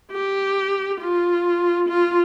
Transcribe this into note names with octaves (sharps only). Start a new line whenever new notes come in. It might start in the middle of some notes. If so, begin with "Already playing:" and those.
G4
F4
F4